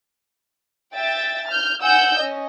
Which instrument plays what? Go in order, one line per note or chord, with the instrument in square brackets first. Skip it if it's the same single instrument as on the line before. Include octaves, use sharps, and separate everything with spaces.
[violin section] E5 G5 A6
F6 G6
F#5 G#5 E6 G6
C#4 D#5